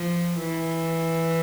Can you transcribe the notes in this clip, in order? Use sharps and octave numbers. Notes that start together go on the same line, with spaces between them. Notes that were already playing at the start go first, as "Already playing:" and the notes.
Already playing: F3
E3